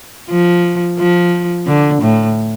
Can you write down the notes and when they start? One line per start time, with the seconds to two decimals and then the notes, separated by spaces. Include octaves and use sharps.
0.30 F3
0.99 F3
1.67 D3
2.02 A2